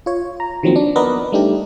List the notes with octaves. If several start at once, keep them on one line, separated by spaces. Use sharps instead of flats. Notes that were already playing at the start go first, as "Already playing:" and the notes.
F4 C#5
A#5
D#3 F3 F#3 A#3 C4
D4
B3 A#4 B4 D5 D#5
G3 A3 D4 D#4 G4